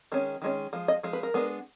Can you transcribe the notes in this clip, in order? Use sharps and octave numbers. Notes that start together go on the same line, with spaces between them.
D#3 G#3 C#4
D#3 G#3 C#4
F3 G#3
D#5
F3 G#3
B4
A#4
G#3 B3 D4